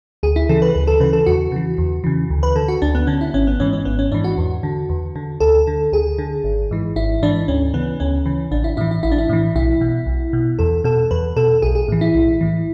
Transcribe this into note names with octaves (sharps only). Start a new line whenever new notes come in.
D2 G#4
E4
C#3 E3 A4
B4
D2 B4
A4
C#3 E3 B4
A4
E2 F#4
C#3 E3
E2
C#3 E3
D2
B4
D3 A4
F#4
D2 D4
B3
D3 C#4
E4
G#1 C#4
B3
G#2 E3 C#4
C#4
G#1 B3
C#4
G#2 E3 D4
F#4
E2
D3
E2
D3
D2 A4
D3
D2 G#4
D3
G#1
G#2 E3
G#1 E4
G#2 E3 D4
D2 C#4
C#3 E3 B3
D2 C#4
C#3 E3
A1 D4
E4
A2 E3 E4
E4
A1 E4
D4
E4
A2 E3
B1 E4
B2
B1
B2
E2 A4
B2 A4
E2 B4
B2 A4
B1 G#4
G#4
A2 E3
E4
B1
A2 E3